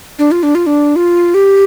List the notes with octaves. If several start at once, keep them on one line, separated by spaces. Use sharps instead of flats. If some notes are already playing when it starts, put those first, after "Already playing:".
D4
F4
D4
F4
D4
F4
G4